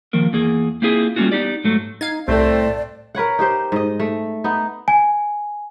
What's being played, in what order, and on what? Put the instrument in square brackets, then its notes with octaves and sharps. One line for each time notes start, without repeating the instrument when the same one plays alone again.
[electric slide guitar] D#3 F3 A#3 A#4
E2 A#3 G#4
A#3 C4 E4 F4 G#4
G3 A3 A#3 C#4 F4 F#4
B3 D#4 G4 D5
G#2 F#3 A3
[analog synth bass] D#4 [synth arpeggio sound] F5 G#6
[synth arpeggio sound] C2 [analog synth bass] A2 [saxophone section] A3 C4 [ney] D5
[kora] A#4 B4 C#5 F#5
D#4 G4 C5
G#2 D#5
A3
B3 D#4
[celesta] G#5